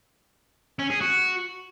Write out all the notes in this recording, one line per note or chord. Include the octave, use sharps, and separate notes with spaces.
C#4
G#4
F#4